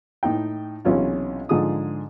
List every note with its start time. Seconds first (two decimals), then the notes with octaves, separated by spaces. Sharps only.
0.23 A2 D#4 G5
0.85 B1 C3 E3 C#4 E4 F4
1.49 G#2 D3 F3 G#4 D#6